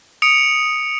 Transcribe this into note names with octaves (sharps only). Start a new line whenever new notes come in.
D#6 C#7 D7 F7